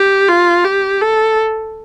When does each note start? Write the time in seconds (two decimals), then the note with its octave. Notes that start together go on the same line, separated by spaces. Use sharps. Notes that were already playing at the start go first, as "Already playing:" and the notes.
Already playing: G4
0.28 F4
0.65 G4
1.02 A4